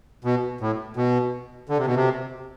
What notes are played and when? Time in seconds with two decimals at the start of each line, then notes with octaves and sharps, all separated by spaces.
0.24 B2
0.61 A2
0.96 B2
1.69 D3
1.78 C3
1.86 B2
1.95 C3